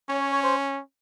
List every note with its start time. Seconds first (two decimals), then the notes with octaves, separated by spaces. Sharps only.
0.09 C#4 C#5
0.21 C#5
0.32 C#5
0.43 C5